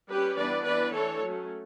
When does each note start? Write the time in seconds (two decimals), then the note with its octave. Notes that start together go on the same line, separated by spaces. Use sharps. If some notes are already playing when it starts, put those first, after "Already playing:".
0.10 G3 C#4 G4 B4
0.38 E3 G3 B3 D4 B4 D5
0.66 E3 B3 D4 B4 D5
0.94 E3 A3 D4 A4 C#5
1.23 F#3 A3 C#4